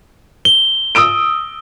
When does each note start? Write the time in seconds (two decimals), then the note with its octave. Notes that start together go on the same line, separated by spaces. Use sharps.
0.45 G7
0.95 D#6 E6 D7